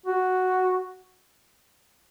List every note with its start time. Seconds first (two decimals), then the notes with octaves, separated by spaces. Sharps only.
0.06 F#4